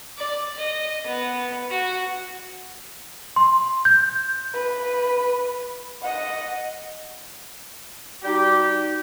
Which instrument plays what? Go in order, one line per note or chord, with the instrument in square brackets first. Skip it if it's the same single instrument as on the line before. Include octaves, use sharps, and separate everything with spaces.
[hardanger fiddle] D5
D#5
B3
F#4
[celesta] C6
G6
[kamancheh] B4
D#5 F#5
[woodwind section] G3 D#4 F#4 G4